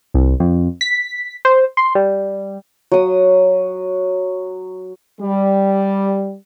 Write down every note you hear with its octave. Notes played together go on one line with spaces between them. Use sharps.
C2
F2
B6
C5
C6
G3
F#3 D#6
G3